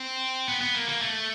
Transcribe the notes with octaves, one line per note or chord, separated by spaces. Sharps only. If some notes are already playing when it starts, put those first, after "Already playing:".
Already playing: C4
B3
B3
A#3
A#3
A3